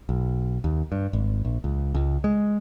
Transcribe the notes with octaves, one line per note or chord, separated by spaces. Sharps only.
B1
D#2
G2
G#1
A#1
C#2
C#2
G#3